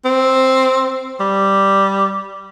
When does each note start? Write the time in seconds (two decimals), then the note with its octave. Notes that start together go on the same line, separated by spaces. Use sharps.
0.05 C4
1.20 G3